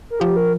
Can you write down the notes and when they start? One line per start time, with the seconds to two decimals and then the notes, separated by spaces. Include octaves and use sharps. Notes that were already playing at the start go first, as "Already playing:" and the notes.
0.10 A#4
0.20 F3 G4
0.36 A#4